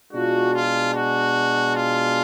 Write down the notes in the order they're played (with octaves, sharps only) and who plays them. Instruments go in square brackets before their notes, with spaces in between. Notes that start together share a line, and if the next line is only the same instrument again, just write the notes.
[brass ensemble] B2 G#3 D4 F4 F#4
F4
F#4
F4